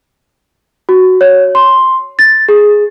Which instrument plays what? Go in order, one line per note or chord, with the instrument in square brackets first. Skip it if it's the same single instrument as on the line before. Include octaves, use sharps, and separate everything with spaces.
[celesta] F#4
C#5
C6
A6
G#4